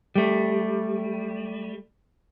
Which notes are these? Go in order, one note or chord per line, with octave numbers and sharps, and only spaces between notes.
G3 A3